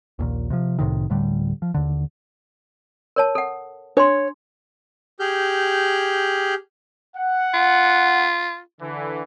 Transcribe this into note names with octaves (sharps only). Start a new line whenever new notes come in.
A#1 D#2 A#2
C3 F3
C2 A2 C3 D#3
D1 A2 D3 G3
F3
D#2 D3
A#4 C#5 A5
A4 F#5
D4 C#5 C6
G4 G#4 F6 G6
F#5
F4
D3 E3